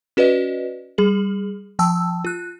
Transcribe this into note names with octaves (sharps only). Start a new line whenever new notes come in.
C#4 F#4 B4 D5 D#5
G3 G#4 F#7
F3 G5 A5 E6
F4 F#6